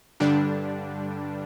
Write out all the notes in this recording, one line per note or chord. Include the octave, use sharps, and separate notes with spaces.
G2 D3 G3 D4